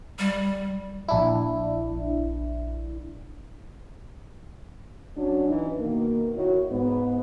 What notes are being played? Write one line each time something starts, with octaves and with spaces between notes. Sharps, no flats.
G3
A#1 D4 E4
F#3 C#4 D4
E3 D#4
B2 D#3 A#3
D#3 E4 F#4 C#5
G#2 B3